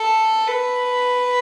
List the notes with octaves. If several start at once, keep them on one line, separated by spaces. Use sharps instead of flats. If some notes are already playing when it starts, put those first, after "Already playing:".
Already playing: A4
B4